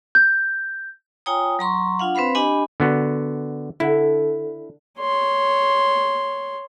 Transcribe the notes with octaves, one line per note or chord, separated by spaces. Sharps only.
G6
F4 C#5 G5 G#5 A#5 D#6
F#3 A#5 C6 C#6
D4 F4 F5 F#5
C4 B4 C5 F5 B5
D4 G4 D#5 G#5 B5
D3 B3 F#4
D3 E4
C#5 C6